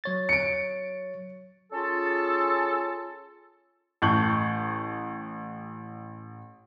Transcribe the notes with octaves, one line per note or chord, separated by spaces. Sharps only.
F#3 C#5 A6
C#7 D7
C#4 F4 G#4 A4
A1 A5 C#6 G6 F#7